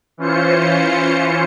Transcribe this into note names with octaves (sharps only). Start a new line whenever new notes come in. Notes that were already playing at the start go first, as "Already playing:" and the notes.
E3 C#4 F4 C5 C#7